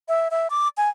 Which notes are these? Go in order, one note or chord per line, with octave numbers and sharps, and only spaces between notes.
E5
E5
D6
G#5